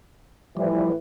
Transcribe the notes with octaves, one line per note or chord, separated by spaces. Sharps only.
A2 E3 F3 G3